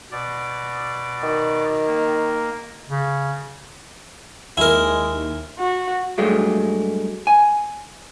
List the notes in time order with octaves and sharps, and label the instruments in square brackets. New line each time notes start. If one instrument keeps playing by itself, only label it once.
[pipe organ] B2 D5
[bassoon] D#3
[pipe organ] A#3
[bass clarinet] C#3
[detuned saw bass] D#2 [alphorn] G#3 [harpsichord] E4 A#4
[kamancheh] F#4
[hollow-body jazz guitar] G2 F#3 G#3 A3
G#5